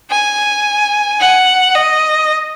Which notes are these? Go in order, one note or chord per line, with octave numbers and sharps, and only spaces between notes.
G#5
F#5
D#5